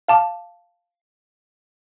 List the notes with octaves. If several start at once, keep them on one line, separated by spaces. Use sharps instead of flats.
F5 A5 D6